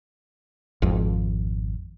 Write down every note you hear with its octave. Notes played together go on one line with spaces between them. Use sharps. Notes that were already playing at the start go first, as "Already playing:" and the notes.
G#1 F2